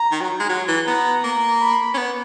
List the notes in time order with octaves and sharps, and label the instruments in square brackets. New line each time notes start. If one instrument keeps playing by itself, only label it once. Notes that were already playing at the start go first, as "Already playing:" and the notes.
Already playing: [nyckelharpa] A#5
[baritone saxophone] D#3
F#3
G#3
F#3
E3
[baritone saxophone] B3 [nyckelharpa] A#5
[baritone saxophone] A#3
[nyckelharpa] B5
[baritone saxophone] C#4
B3